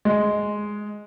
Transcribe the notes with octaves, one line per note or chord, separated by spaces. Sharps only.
G#3